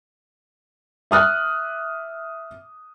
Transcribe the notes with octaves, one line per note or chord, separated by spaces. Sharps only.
E5 D#6 F6 F#6